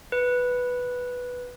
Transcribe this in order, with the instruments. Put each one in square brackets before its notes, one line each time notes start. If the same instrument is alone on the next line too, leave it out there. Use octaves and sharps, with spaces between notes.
[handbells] B4